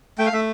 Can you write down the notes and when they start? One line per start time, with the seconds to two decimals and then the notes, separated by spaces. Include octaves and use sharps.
0.18 A3 G5
0.26 F5
0.33 A3 E5